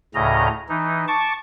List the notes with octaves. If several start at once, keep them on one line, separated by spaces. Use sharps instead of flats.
D2 A2 C#3 D#5 A#5
E3 D#4
A5 C#6 D6